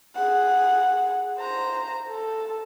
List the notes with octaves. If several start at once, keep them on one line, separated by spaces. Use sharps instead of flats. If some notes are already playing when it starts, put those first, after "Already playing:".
G#4 F#5
C5 A#5
A4